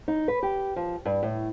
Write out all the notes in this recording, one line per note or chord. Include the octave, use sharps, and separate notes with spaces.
D#4
B4
G4
F3
G2
A2